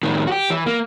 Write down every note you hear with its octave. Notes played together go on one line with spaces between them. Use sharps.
A2 D#3
F#4 G4
E3
A#3